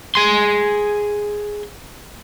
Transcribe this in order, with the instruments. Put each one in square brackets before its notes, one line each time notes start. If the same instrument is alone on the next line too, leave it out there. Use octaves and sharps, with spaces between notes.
[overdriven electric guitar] G#4 C6